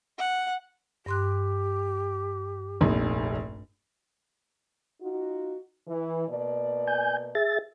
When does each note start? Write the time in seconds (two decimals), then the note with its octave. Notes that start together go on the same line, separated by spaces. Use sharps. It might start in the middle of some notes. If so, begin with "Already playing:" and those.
0.18 F#5
1.06 G2 G4 C6 F#6
2.81 F1 A#1 D#4
5.01 D#4 F4 F#4
5.88 E3
6.28 B2 A#3 D5
6.87 G#5 G6
7.35 G#4 E5 A6